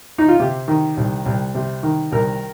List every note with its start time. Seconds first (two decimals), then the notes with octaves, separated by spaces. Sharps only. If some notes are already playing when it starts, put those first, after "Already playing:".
0.18 D#4
0.28 F4
0.39 C3 G4
0.68 D#3
0.97 C2
1.26 C2
1.55 C3
1.83 D#3
2.12 C2 A#4